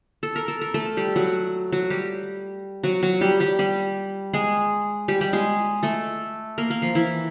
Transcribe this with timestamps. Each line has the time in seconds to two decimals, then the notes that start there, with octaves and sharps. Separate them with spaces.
0.23 A4
0.36 A#4
0.48 A4
0.61 A#4
0.74 A3 A4
0.97 G3 G4
1.16 F#3 F#4
1.72 F#3 F#4
1.90 G3 G4
2.83 F#3 F#4
3.03 F#3 F#4
3.21 G3 G4
3.40 G3 G4
3.59 G3 G4
4.33 G#3 G#4
5.08 G3 G4
5.21 G3 G4
5.33 G#3 G#4
5.83 A3 A4
6.58 A#3 A#4
6.70 A#3 A#4
6.82 F3 F4
6.95 E3 E4